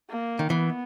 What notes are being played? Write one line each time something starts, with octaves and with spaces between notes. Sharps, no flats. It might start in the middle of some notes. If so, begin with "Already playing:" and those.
A#3
D#3
E3 B3